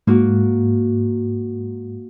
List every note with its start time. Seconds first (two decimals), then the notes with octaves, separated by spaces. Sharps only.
0.07 G#2 A#3 F#4